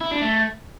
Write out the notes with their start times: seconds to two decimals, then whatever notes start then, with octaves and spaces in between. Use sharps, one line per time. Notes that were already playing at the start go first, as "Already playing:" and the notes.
0.01 E4
0.11 D4
0.21 A3